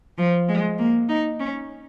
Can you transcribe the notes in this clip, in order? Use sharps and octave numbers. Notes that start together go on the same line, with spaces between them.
F3
G#3
A#3
D#4
C#4